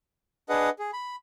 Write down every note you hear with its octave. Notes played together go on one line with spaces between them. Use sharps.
D4 G#4 B4 D#5 F#5
G#4
B5